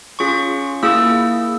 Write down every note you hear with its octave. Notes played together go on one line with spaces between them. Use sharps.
C#4 F4 G#4 C#6
A#3 E4 G#4 E6